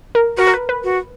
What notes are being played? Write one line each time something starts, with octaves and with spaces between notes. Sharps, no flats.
A#4
F#4 A#4
A#4
B4
B4
F#4